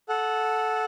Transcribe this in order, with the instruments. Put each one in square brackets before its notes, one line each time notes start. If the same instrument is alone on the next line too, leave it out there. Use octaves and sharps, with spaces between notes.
[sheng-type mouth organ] A4 F#5